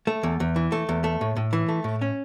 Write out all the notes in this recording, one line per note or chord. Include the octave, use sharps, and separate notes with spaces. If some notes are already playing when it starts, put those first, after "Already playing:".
A3
E2
E2
E3
A3
E2
A3
A2
A2
E3
A3
A2
C#4